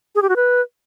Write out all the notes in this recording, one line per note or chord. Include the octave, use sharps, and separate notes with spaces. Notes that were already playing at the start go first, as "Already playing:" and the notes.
G#4
G4
F#4
B4